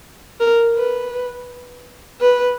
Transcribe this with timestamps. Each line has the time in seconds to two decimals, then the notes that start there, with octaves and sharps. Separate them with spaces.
0.40 A#4
0.76 B4
2.21 B4